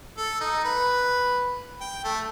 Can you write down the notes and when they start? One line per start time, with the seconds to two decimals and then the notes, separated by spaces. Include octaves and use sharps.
0.17 A4
0.41 D#4
0.64 B4
1.81 G5
2.04 A3